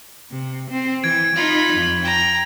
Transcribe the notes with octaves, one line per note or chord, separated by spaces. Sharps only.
C3
C4
E3 G#6 D7
D#4 F4 B5
F2
G5 A#5